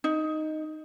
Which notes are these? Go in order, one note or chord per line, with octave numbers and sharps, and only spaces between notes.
D#4